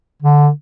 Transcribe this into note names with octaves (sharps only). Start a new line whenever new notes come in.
D3